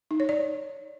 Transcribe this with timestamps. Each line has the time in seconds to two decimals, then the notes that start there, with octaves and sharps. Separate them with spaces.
0.11 D#4
0.20 C#5
0.29 D5